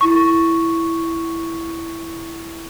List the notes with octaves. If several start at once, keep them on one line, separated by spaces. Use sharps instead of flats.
E4 C#6